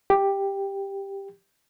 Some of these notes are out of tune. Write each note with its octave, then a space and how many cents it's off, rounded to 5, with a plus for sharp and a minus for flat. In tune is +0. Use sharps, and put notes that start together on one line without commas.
G4 +5